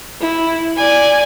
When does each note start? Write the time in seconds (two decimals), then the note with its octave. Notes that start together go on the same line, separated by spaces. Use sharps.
0.21 E4
0.77 D5 G#5